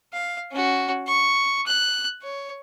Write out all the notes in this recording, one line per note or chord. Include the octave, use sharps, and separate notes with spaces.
F5
C#4 F#4
C#6
F#6
C#5